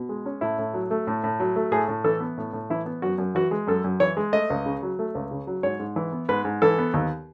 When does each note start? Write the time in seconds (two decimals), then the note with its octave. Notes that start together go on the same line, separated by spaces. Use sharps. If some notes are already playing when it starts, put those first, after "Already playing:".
Already playing: B2
0.09 G#3
0.26 C#4
0.41 A2 E4
0.58 A2
0.74 F#3
0.91 A3
1.07 A2
1.24 A2
1.40 F#3
1.56 A3
1.72 A2 G#4
1.88 A2
2.04 E3 A4
2.20 B3
2.38 A2
2.53 A2
2.70 E3 E4
2.86 B3
3.02 F#2 F#4
3.18 F#2
3.35 E3 F#4
3.51 G#3
3.67 F#2 A4
3.84 F#2
4.00 E3 C#5
4.17 G#3
4.33 A3 D#5
4.50 C#2
4.66 C#3
4.83 F#3
4.99 A3
5.15 C#2
5.31 C#3
5.47 F#3
5.63 G#2 C#5
5.79 G#2
5.96 E3
6.12 B3
6.29 G#2 B4
6.45 G#2
6.62 E3 A4
6.78 B3
6.94 D#2